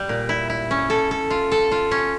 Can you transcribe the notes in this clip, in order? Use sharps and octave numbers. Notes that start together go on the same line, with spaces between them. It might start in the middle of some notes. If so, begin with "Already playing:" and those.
Already playing: G3
A#2
E4
E4
C#4
A4
A4
F4
A4
F4
C#4